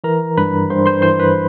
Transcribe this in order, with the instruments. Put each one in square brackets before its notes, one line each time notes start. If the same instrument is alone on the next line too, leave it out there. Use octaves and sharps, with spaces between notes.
[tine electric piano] E3 A#4 A#5
G2 B4 B5
G2 C5 C6
C5 C6
E3 C5 C6
B4 B5